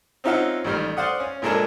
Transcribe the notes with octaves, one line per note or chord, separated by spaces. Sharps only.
C4 C#4 D#4 F4 E5 F#5
A1 D#3 G3 F6
C5 D5 F5 F#5 D#6
C#4
A#1 A#2 G#3 D4 A4 A#4